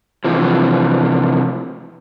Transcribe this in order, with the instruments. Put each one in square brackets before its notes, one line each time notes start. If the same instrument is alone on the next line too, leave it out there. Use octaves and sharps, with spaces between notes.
[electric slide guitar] C3 E3 F3